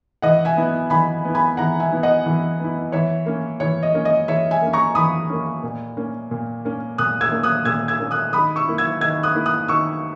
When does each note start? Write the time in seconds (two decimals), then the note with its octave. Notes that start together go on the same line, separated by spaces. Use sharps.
0.22 E3 D#5 F#5
0.45 E5 G#5
0.57 B3 E4
0.90 E3 G#5 B5
1.25 B3 E4
1.35 G#5 B5
1.57 E3 F#5 A#5
1.80 E5 G#5
1.92 B3 E4
2.03 D#5 F#5
2.26 E3
2.60 B3 E4
2.92 E3 C#5 E5
3.26 A#3 C#4
3.60 E3 C#5
3.83 D#5
3.94 A#3 C#4
4.05 D#5
4.28 E3 C#5 E5
4.51 E5 G#5
4.62 A#3 C#4
4.73 A#5 C#6
4.95 E3 B5 D#6
5.29 A#3 C#4
5.63 A#2
5.97 A#3 C#4
6.31 A#2
6.65 A#3 C#4
6.98 A#2 D#6 F#6
7.21 E6 G#6
7.32 A#3 C#4
7.43 D#6 F#6
7.65 A#2 E6 G#6
7.88 E6 G#6
8.00 A#3 C#4
8.11 D#6 F#6
8.33 D#3 B5 D#6
8.56 C#6 E6
8.68 A#3 E4
8.78 E6 G#6
9.01 D#3 E6 G#6
9.23 D#6 F#6
9.35 A#3 E4
9.46 D#6 F#6
9.68 D#3 C#6 E6